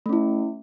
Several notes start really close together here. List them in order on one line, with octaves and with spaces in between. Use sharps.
A3 C#4 E4